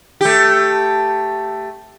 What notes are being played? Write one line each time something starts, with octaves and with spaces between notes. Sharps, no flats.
A3 G4